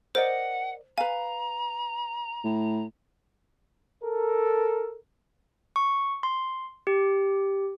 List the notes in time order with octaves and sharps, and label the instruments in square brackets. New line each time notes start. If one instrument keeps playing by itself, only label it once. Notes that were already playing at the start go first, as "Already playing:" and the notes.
[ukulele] A#4 D5 D#5 [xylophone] C5 [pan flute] F#5
[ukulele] B4 F5 [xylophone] G#5 [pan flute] A#5
[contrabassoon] A2
[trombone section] A4 A#4
[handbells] C#6
C6
G4